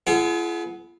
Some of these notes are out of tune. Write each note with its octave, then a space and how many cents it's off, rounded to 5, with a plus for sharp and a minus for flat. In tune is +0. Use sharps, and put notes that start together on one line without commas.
B3 +0 F4 -45 G#4 +35